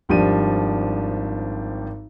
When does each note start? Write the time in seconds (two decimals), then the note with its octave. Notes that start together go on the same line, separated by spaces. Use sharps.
0.09 G#1 F3 G3 D4 D#7